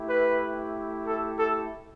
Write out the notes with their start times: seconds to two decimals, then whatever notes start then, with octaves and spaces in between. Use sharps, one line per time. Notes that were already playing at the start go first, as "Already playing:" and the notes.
Already playing: A3 E4 G4
0.10 B4
1.07 A4
1.39 A4